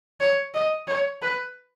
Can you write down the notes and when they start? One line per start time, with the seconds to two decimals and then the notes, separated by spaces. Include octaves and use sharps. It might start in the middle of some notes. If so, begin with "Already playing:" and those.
0.20 C#5
0.54 D#5
0.87 C#5
1.22 B4